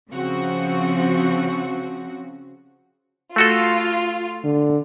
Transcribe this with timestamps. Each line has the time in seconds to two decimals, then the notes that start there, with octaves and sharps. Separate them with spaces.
0.10 C#3 F3 C4 F#4
3.36 A3 F4 F#4 A4
4.44 D3